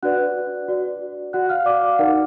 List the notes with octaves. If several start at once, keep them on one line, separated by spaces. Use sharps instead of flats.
D4 F#4 B4 D5 F#5 F#6
F#4 D5
F#4 D5 F#5 F#6
F5 F6
D5 D6
F5
D#4 A#4 D5 F#5